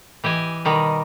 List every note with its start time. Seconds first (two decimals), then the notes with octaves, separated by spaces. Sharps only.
0.24 E3 G4 D#5 G#5
0.65 B2 D#3 G3